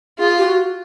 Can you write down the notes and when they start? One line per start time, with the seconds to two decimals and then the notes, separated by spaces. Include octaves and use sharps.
0.18 F4 G#4
0.38 G4
0.46 F#4